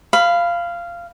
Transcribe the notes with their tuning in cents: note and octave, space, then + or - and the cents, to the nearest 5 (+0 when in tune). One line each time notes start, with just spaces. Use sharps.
F5 -15 B5 +15